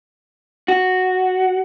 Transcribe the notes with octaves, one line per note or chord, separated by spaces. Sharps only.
F#4